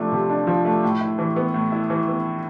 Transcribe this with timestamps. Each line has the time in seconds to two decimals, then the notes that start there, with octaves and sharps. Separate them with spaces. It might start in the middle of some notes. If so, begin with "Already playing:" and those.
Already playing: C3 F3 A3 D4
0.12 C3
0.29 D4
0.47 F3
0.65 A3
0.83 A2
1.01 E4
1.19 E3
1.36 B3
1.54 A2
1.72 E4
1.90 E3
2.08 B3